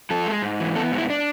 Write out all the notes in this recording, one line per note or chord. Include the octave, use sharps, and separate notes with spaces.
F3 A4
G#3
G#2
E3
B3 A4
G#2
E4
D4